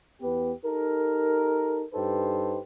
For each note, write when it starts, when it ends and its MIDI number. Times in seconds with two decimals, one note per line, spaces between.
0.21 0.51 40
0.21 0.51 59
0.21 0.51 67
0.21 0.51 71
0.64 1.83 63
0.64 1.83 67
0.64 1.83 69
0.64 1.83 70
1.93 2.58 43
1.93 2.58 63
1.93 2.58 67
1.93 2.58 69
1.93 2.58 71
1.93 2.58 72